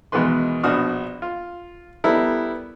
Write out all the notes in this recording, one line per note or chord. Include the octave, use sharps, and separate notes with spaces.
E2 B2 D#3 G#3 B4 C6
A#1 B2 D4 F#4 D#6 F6
F4
G3 B3 E4 A4 A#4